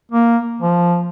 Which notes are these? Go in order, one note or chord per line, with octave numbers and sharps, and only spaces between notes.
A#3
F3